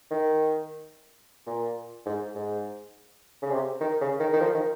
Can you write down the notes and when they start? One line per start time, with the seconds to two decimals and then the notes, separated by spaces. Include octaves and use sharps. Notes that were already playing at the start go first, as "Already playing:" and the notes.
0.11 D#3
1.47 A#2
2.06 G#2
2.35 G#2
3.42 C#3
3.51 C3
3.81 D#3
4.01 C#3
4.20 D#3
4.33 D#3
4.40 F3
4.54 D#3